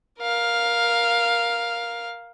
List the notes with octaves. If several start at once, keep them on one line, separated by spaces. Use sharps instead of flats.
A#4 F5